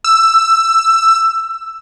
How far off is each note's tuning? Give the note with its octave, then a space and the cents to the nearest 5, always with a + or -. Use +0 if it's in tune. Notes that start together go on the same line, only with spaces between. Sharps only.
E6 +10